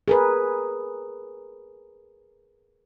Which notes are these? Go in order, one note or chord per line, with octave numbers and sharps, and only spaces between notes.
G#4 A#4 B4